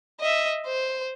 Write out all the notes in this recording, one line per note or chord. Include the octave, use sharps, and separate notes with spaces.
D#5 E5
C5